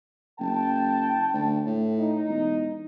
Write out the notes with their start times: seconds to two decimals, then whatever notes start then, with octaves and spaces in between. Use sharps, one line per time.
0.40 F#1 G5 A5
1.33 D2
1.66 A2
1.99 D#4
2.28 E1